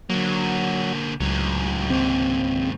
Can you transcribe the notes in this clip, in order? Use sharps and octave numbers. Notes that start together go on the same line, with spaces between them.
D3 F#3 A#3
C#2 A2 F#3
D#2 G#2 C4